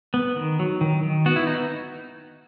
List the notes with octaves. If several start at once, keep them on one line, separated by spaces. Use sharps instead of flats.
B3
D#3
F#3
D#3
D#3
B3 F#4
E4
D#4